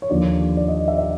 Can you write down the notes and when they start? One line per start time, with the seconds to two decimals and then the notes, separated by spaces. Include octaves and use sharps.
0.02 C#5
0.10 D#2 D3 F3 D5
0.57 D5
0.68 D#5
0.88 E5
0.99 E5